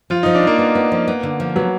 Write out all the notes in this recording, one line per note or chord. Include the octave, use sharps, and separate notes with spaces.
F3 F4
F3 D#4
D4
A#3 D#4
B3
B3
F3
B3
D3
F3
F#3 B3